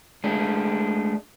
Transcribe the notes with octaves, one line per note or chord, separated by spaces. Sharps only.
G#3 A3 D4